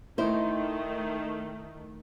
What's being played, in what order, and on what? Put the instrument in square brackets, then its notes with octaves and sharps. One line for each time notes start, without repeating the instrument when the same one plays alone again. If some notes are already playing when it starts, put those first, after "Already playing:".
[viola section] D#3 A3 [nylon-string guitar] D#4 E4 C5